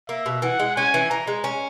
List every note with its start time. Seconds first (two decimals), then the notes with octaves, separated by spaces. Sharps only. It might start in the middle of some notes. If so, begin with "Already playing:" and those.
0.09 A#3 E5
0.26 B2
0.42 E3 F#5
0.59 G#3
0.76 C#4 G#5
0.94 E3
1.10 E3 A#5
1.27 G#3
1.44 C#4